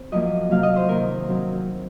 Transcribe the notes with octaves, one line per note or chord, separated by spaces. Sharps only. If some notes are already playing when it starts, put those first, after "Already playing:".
Already playing: C4
F#2 F3 A#3 D#5
C3 F#3 A#3 F5
D#5
C5
C3 D#3 A#3 A#4
F#3 C4